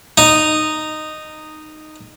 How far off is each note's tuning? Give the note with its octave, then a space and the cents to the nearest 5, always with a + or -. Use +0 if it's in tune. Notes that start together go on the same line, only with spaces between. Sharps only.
D#4 -10